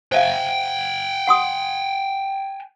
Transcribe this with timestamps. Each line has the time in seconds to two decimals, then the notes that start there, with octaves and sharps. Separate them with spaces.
0.12 C5 E5 F5 G5 G#5
1.27 F#5 C6 D#6